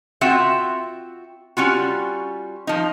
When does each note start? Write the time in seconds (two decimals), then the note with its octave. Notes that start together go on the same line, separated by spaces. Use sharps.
0.21 C4 F4 F#4 E5 F#5 G5
1.57 G3 C#4 F4 F#4
2.67 F3 D#4